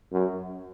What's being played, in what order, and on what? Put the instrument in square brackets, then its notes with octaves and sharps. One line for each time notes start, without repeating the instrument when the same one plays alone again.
[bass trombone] F#2